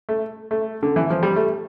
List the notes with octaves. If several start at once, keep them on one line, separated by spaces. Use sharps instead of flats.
A3
A3
D3
E3
F3
G3
A3